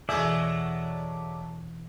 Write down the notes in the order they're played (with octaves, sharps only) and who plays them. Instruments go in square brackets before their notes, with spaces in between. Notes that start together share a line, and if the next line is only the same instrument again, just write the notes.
[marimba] E2 B2 E3 [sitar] F#3 G#3 A3 [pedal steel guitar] D5 E5